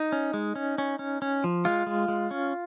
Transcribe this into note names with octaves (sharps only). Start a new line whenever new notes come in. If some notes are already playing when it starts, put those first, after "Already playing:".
Already playing: D#4
C#4
G#3
C#4
C#4
C#4
C#4
F3
G#3 F4
G#3
G#3
C#4